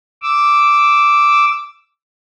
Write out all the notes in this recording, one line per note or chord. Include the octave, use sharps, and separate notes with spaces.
D6 E6